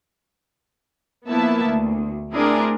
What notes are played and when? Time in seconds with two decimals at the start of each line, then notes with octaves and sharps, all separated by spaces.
1.28 F3 A#3 B3 E4 E5 A5
1.64 D2
2.32 A3 C4 D4 E4 G#4 A#4